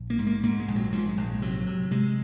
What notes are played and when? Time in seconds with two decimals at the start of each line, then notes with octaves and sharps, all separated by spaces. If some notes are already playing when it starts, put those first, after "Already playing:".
Already playing: A#1
0.10 A#3
0.19 G#2
0.27 A#3
0.43 G#2 A#3
0.59 G#3
0.68 A#1
0.76 F#3
0.92 G#2 F3
1.09 G#3
1.17 A#1
1.42 C3 F#3
1.67 C3
1.91 C3 G#3